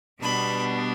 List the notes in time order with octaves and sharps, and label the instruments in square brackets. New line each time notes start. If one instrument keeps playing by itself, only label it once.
[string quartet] B2 G3 B3 D4 B5